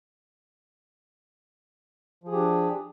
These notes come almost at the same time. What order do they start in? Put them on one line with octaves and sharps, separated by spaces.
F3 G#4 G4 D4